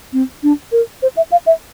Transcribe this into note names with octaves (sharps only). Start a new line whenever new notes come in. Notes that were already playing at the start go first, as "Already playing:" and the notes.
C4
D4
A#4
C5
E5
F5
E5